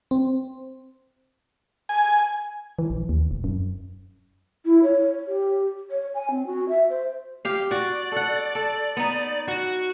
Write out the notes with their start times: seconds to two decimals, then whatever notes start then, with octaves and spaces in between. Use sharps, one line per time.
0.11 C4
1.89 G#5
2.79 E3
2.90 A#1
3.09 D#2
3.31 E1
3.44 F#2
4.65 E4
4.83 C#5
5.27 G4
5.90 C#5
6.14 G#5
6.30 C4
6.46 F#4
6.69 E5
6.89 C5
7.45 G4 F5
7.71 F#4 D5
8.12 A4 F#5
8.55 A4
8.97 B3 D#4
9.48 F#4